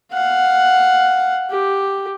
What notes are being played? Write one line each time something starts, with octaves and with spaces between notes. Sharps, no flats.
F5 F#5
G4